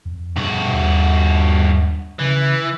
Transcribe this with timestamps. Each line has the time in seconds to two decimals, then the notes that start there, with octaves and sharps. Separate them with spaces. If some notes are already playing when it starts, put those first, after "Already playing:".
0.05 F2
0.36 G2 B2 F#4
0.73 D#2
2.19 C#3 E3